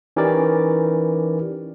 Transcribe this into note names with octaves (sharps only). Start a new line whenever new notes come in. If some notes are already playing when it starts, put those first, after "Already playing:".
E3 C#4 D#4 G4 A#4 D5